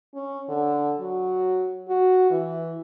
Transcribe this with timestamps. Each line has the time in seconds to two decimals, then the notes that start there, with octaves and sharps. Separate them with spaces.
0.14 C#4
0.48 D3
1.00 F#3
1.88 F#4
2.30 E3